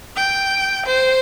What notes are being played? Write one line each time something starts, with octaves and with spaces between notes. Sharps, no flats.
G5
C5